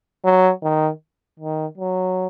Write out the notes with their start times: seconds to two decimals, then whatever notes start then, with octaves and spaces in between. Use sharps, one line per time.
0.24 F#3
0.63 D#3
1.39 D#3
1.77 F#3